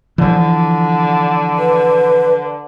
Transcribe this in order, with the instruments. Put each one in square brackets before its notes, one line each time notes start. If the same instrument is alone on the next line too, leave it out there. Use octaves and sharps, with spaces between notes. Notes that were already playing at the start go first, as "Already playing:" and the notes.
[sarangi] D3 [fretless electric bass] E3 F3
[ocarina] B4